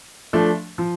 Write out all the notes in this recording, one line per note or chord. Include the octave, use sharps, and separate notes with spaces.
F3 A3 D4
F3